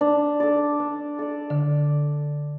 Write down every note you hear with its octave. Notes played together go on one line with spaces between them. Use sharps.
D4
A4 D5
D4
A4 D5
D3